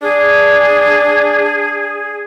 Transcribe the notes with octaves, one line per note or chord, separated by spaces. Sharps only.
D4 G#4